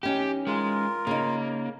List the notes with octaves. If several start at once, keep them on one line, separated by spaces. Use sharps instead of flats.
E3 C#4 D#4 G4
G#3 F4 A#4
C#3 A#3 D#4